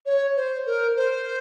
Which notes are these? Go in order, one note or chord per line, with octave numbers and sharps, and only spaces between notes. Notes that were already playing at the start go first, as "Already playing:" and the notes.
C#5
C5
A#4
C5